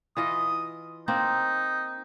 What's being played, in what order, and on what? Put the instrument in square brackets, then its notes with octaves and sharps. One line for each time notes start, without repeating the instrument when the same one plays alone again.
[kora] E3 F4 D#5 [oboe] D#6
[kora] A#3 C4 [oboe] D#4